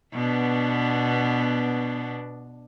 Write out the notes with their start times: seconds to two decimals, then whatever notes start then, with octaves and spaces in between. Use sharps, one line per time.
0.14 B2 B3 D4